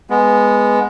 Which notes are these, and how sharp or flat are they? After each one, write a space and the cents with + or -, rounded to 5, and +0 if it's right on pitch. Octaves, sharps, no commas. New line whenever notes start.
G#3 +0 B3 +0